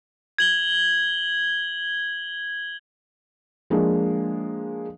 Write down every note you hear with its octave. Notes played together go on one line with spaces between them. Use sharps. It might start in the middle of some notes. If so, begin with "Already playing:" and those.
G#6 F#7 G7
F3 G#3 A#3 D4